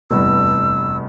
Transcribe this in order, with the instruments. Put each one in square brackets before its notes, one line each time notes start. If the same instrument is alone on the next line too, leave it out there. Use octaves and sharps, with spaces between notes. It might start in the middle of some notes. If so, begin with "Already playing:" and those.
[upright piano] F1 E2 G2 [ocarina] E6